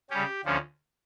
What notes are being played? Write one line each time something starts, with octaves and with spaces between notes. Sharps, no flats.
C#3 G3 C#4 G4
D2 D3 F3 C#4